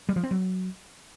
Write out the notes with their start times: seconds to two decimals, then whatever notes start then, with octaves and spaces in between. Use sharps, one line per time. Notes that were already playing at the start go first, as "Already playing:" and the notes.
0.09 G3
0.16 F3
0.23 C4
0.31 F#3